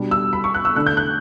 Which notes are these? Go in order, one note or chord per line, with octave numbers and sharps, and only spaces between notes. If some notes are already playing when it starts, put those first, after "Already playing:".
Already playing: B2 G3 D4
E6
B5
C#6
F#6
E6
D3 A3 D4 F#6
G6
F#6